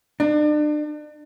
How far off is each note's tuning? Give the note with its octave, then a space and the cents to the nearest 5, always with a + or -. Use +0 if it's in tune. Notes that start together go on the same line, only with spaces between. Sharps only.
D4 +35